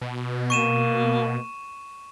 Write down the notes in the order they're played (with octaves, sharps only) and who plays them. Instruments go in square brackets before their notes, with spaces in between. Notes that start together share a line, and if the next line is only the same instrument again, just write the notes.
[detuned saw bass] B2
[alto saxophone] A#3 [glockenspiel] C#6 D#7 E7